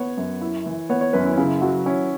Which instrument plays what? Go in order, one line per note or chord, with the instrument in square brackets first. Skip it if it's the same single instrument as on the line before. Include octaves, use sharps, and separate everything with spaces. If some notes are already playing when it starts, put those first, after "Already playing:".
Already playing: [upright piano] B3 [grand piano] C#5
[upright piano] F#2
E4
E3
[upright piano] B3 [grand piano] C#5
[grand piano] C#5
[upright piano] F#2 [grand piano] B4
[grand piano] C#4
E4
C#4
[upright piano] C#3 [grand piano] E4
[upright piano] F#3 [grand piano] F#4
[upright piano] C#4 [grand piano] E4